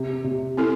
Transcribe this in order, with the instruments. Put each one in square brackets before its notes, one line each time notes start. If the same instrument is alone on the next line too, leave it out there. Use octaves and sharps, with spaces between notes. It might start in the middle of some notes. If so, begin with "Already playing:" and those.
Already playing: [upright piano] C3
C3
[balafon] C4 E4 A4